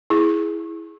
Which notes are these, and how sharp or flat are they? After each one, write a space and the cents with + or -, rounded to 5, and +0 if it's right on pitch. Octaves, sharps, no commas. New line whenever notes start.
E4 +0 G#4 +0